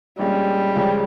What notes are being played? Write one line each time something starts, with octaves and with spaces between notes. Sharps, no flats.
A#1 A#2 G3 G#3 C#4
C#2 C#3 F3 G#3 C#4